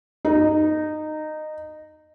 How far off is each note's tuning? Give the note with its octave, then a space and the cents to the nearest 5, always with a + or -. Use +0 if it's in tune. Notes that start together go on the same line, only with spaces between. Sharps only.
D#4 -15